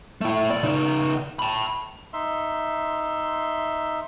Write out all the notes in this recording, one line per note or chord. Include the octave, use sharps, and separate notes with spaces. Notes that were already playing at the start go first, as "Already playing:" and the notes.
A3 E4
B1 D5
C#3 D#4
A5 B5
D#4 E5 C6